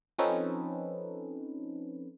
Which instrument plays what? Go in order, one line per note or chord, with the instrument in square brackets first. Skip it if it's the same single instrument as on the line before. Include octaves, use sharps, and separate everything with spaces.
[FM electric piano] F3 C4 C#4 D#4 A4 B4